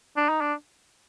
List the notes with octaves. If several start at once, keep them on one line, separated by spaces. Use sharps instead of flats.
D4
D#4
D4